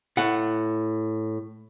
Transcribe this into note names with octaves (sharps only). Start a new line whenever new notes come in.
A2 F#5